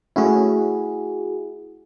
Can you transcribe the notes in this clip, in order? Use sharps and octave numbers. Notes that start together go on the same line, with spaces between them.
A3 C#4 E4 F#4 G#4